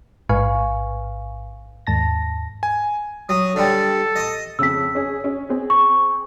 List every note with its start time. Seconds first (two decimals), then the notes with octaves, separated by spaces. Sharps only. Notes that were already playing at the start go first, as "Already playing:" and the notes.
0.29 A1 G#2 B4 F5 G#5 C#6
1.87 D#2 G#2 A5 A#6
2.63 G#5
3.29 F#3 D#6
3.56 D3 G3 A4
4.16 D#5 D#6
4.59 F2 C#3 E6 B6
4.95 C#4 G#4
5.24 C#4
5.49 C4 G#4
5.70 C#6